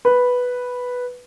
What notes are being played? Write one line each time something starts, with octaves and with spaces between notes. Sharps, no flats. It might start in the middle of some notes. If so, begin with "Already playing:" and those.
B4